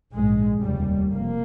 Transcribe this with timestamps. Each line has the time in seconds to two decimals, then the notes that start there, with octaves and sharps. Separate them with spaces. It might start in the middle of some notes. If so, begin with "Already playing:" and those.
0.12 A#1 G#2 G#3
0.62 F1 D#2 C#3 G3
1.12 F1 F2 A#3